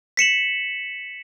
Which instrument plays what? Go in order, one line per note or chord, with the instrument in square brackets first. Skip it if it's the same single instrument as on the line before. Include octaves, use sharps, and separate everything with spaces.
[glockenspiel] B6 C#7 E7 F#7